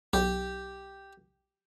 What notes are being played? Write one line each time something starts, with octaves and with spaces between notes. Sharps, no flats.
B1 G4